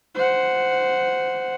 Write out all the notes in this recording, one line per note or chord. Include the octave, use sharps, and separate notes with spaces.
C5 F#5